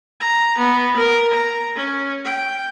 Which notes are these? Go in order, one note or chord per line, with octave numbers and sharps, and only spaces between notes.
A#5
B3
A#4
A#5
C#4
G5